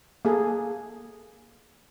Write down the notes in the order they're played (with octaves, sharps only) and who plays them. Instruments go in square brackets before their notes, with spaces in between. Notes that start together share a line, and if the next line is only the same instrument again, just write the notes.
[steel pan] A#3 G#4 A4